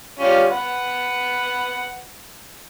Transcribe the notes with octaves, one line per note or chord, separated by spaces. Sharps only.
G3 C#4 F4
B4 F#5